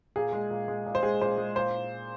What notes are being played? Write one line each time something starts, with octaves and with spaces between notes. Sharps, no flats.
A#2 G#4
G#3
A#2
G#3
A#2
C5
G#3 G#4
A#2 C5
G#3
A#2 C5